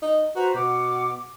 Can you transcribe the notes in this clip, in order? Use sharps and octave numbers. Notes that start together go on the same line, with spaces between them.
D#4
F#4 B4 C5 A#5
B2 F#5 D6